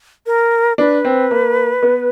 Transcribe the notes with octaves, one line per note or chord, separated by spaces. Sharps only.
A#4
D4 B4
C4
A#3
B3